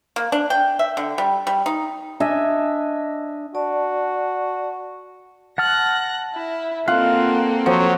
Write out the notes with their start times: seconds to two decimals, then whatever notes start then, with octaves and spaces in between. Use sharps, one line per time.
0.16 A#3
0.32 D4
0.50 G5
0.79 E5
0.97 D3
1.18 G3
1.47 G3
1.66 D#4
2.20 D4 D#5 E5 G#5
3.55 F#4 D5 A5
5.58 F#5 A5 F6 F#6 A#6
6.34 E4
6.88 A#3 C4 F4 A4 F5 F#5
7.66 F3 F#3 F#5